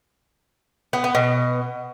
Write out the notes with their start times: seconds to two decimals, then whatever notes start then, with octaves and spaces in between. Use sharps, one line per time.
0.93 B3
1.04 B3
1.15 B2